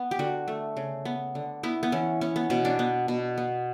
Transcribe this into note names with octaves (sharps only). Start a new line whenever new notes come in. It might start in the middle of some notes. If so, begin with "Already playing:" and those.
Already playing: B3
G4
D3 F#4
A3
C#3
B3
D3
B3 E4
B3
E3 C#4
B3 C#4
B3
B2 C#4
D4
B3
B2
B3